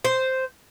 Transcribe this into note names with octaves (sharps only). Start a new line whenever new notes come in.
C5